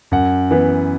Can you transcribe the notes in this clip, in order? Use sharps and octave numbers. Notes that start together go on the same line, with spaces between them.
F#2 F#5
E3 B3